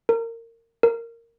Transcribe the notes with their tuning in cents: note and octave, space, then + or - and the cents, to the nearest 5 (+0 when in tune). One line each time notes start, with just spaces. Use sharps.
A#4 -25
A#4 -10